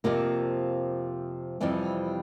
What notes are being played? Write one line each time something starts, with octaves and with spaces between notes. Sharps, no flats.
F2 C3 F3 A#3
F2 C3 E3 G3